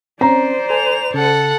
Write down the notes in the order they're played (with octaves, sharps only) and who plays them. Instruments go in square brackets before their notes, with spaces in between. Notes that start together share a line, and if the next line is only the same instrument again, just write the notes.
[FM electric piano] C4 C#4 [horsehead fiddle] C5 D5 [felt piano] A#5
[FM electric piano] A4 G#5 [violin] F7
[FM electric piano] C#3 [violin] A4 F#5